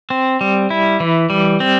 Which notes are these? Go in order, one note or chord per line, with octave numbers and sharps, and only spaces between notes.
C4
G3
E4
E3
G3
C4